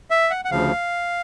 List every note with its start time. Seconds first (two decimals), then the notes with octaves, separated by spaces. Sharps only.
0.11 E5
0.31 F#5
0.45 F#5
0.51 D2 C#3 F3 F5